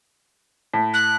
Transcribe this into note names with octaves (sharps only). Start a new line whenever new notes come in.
A2
F#6